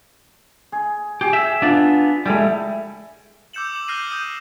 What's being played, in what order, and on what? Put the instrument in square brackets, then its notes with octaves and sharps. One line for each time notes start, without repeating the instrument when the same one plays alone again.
[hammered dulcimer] G#4
[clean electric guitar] G4 [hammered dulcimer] G#4
[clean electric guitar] E5
B3 D4 F4
[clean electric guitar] G3 G#3 [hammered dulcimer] E4 A4
[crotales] D6 E6 G6 C#7 E7 F#7
D6 F#7
F6 G6 A#6 C7 D#7 F#7
D#6 G6 D#7